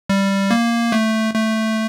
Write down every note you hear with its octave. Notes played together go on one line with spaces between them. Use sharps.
G3
A#3
A3
A3